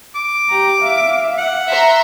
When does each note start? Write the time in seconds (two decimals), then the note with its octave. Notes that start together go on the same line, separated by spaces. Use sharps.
0.16 D6
0.49 G4 A#5
0.80 E5 F5
1.38 F#5
1.72 E5 A#5 C6